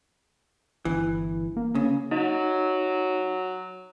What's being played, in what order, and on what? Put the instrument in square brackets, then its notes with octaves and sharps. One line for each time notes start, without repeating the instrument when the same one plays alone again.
[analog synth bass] G1 [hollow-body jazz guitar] E3
[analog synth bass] A#3
[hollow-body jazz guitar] C#3
[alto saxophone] F#3 [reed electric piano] D#4